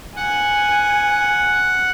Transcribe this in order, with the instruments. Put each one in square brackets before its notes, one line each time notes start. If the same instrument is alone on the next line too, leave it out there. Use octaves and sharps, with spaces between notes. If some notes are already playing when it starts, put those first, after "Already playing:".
[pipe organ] F#5 [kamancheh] G#5